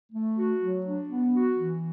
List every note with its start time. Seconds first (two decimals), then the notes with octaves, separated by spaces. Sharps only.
0.12 A3
0.37 F#4
0.61 F#3
0.86 D4
1.10 B3
1.35 F#4
1.59 E3